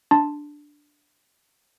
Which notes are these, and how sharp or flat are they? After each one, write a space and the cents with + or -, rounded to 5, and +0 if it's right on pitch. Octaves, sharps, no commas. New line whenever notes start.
D4 +0 A5 +0 C6 +0